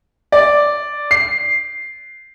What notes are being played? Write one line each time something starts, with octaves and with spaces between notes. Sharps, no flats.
D5
C7